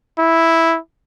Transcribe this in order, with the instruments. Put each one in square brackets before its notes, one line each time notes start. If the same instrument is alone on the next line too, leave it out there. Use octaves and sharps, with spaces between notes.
[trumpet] E4